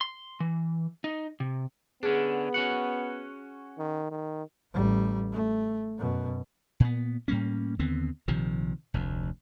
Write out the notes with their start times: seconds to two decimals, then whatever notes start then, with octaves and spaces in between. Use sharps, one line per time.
0.01 C6
0.40 E3
1.04 D#4
1.40 C3
2.03 D3 B3 C#4 D4 G#4
2.54 C#4 F#4 F#5
3.79 D#3
4.11 D#3
4.73 A1 G3
5.32 A3
5.98 F#2 B2
6.80 A#2 B3
7.28 A2 G3 A#3 C#4
7.79 D#2 D3 B3 C4
8.28 A#1 C3 D#3 F3
8.94 F1 D2